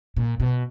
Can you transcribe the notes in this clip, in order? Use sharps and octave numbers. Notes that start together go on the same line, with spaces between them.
A#2
B2